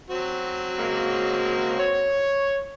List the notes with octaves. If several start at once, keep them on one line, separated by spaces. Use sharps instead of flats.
F#3 C4 F#4
C#3 G#3 A#3
C#5